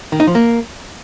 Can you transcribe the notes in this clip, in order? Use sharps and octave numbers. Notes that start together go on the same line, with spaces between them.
D#3
D#4
F3
A#3